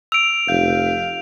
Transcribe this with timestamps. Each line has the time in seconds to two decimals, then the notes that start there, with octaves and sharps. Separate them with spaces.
0.12 E6 D7 F7
0.48 F1 F5 G6